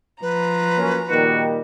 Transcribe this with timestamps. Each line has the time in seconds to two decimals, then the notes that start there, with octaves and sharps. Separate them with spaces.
0.22 F3 B4 A#5
0.77 F#3 A#3 C#4
1.09 A#2 D#3 G3 F#4